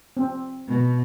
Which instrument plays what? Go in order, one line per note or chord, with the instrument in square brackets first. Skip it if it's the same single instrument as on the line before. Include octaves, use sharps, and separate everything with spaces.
[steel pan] C4
[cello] B2